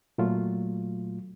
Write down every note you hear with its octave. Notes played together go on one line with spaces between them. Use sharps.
A#2 F#3 A3 F4